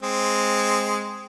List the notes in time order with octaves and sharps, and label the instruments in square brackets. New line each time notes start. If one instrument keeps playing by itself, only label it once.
[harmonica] G#3 C4